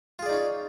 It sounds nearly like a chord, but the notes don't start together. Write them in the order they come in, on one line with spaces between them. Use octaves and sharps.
F4 G#4 D5 D#4 C#4